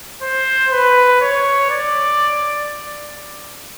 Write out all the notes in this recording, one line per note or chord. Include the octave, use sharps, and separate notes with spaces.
C5
B4
C#5
D5